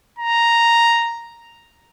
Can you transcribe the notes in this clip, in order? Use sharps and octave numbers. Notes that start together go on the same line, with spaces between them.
A#5